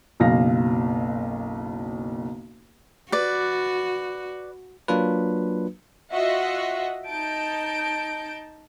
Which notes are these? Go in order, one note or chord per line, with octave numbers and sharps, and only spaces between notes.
F#1 B1 F5 A#6
F#4 B4 D5
F#3 A#3 D4 F4 B4
F4 F#4 D#5 E5 F#5
D#4 A5 G6 D7